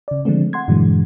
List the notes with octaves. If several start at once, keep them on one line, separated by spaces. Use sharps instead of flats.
C#3 D5
D3 F3 G#3 A3 C4
F#5 C6 G#6
G2 A#2 D3 E3 F#3 G#3